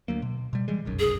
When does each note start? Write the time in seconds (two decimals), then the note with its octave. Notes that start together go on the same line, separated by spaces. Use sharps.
0.08 D2 F#3 A#3
0.22 B2
0.53 B2 G3
0.68 E3 G3 G#3
0.85 F1 B1 F#2
1.00 G#4